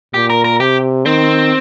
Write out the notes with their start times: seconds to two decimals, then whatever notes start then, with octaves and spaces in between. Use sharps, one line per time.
0.14 A#2 G4
0.30 A#4
0.44 A#4
0.60 C3 G4
1.06 D#3 C4